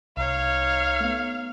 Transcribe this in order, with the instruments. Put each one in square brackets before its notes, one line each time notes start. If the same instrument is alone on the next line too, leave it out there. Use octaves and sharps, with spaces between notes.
[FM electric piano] C2 [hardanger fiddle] D#4 C#5 [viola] F5
[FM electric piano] A3 B3